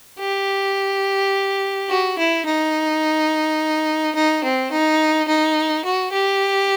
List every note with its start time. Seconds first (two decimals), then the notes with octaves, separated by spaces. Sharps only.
0.19 G4
1.89 F#4
2.18 E4
2.46 D#4
4.15 D#4
4.44 C4
4.71 D#4
5.28 D#4
5.85 F#4
6.12 G4